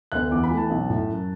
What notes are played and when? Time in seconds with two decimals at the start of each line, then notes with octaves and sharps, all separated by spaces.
0.12 D2 D3 B3 F#6
0.31 E2 D6
0.44 B5
0.51 E3 A3
0.57 A5
0.70 B1
0.90 A2 A3
1.09 F#2